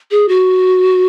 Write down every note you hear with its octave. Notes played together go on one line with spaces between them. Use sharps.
G#4
F#4